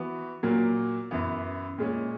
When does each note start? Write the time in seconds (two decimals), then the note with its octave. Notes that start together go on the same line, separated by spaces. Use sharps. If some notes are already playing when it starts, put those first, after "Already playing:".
Already playing: E3 B3 F#4
0.43 A#2 F#3 A#3
1.11 F#2 E3 B3
1.78 A#2 G#3 C#4